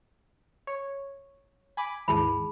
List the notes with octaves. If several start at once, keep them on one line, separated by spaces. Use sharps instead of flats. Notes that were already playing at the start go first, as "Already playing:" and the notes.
C#5
G#5 B5 D6
D#2 G#2 E3 G#4 A5 B5